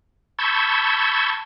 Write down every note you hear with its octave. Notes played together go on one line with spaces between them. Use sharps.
A5 B5 C#6 E6 G6 G#6